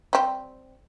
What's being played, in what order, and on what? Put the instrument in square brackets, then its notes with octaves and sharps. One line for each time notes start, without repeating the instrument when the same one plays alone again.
[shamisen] G3 C4